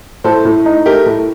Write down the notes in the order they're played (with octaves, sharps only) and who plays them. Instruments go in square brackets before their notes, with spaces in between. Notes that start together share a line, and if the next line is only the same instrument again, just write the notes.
[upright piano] A2 [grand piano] A4 C5
[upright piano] A2
D#4
[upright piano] A3 [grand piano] G4 A#4
[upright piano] A2